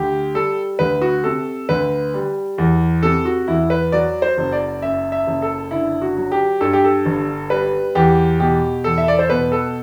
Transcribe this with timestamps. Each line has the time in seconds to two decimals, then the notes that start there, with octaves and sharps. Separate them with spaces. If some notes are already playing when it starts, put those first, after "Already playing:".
Already playing: D2 G4
0.34 G3 A4
0.79 D2 B4
1.02 F#4
1.24 C3 A4
1.69 D2 B4
2.14 G3
2.58 E2
3.03 C3 A4
3.25 F#4
3.48 E2 E4
3.70 B4
3.92 F#3 D5
4.22 C5
4.37 F#1
4.52 D5
4.82 F#2 E5
5.12 E5
5.27 F#1
5.42 A4
5.71 D3 E4
6.02 F#4
6.17 F#3
6.32 G4
6.61 G2 A4
6.73 G4
6.84 A4
7.06 G1
7.50 G3 B4
7.95 E2 G4
8.40 B2 G4
8.84 E2 A4
8.98 E5
9.08 D5
9.19 C5
9.30 B2 B4
9.52 A4